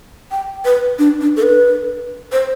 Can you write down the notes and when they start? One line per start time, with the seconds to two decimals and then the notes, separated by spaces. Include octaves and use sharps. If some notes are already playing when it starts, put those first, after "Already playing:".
0.31 G5
0.65 B4
0.99 D4
1.21 D4
1.36 A4
1.43 B4
2.32 C5